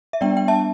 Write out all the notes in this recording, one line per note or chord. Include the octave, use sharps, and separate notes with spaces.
E5
G3 B3 D4 D5 G5
G5
E5 A5